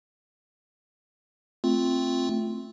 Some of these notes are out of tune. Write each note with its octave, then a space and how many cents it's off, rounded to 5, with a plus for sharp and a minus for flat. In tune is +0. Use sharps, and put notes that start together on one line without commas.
A3 +0 C4 +0 F4 +0